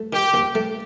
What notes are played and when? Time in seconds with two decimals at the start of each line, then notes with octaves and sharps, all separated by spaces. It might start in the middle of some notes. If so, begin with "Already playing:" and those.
Already playing: A3
0.13 D#3 G4
0.34 D#2
0.55 A3